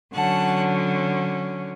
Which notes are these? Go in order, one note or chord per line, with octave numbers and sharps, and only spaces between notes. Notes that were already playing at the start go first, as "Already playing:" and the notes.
D3 F#3 C#4 F#5 A5